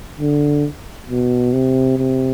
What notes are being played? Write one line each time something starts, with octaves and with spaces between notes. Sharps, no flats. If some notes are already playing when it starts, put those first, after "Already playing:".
D3
B2
C3
C3